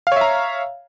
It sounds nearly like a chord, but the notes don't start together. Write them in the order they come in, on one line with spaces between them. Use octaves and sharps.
F5 C#5 E5 A#5